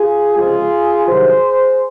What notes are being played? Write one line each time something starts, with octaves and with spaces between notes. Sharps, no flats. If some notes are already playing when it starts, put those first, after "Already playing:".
Already playing: F4 G#4
C#2 C3 F3 G#3 C4 F4 G#4
C2 C3 D#3 F#3 G#4 C5